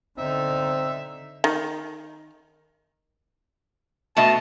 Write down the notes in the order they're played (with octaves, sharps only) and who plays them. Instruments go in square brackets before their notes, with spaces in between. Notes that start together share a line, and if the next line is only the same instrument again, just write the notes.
[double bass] D3 D#4 [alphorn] C4 [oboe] E5
[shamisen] D#3
[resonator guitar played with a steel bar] B2 A3 D#5 [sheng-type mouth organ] A5